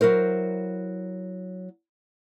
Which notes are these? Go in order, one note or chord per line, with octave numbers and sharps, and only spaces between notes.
F#3 E4 A#4 C5